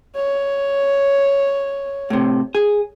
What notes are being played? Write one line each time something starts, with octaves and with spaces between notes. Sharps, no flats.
C#5
A2 C3
G#4